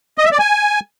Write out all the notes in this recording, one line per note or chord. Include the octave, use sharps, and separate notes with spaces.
D#5
E5
D5
G#5